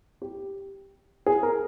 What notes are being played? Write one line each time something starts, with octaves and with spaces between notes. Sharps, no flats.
G4
G#4
A#4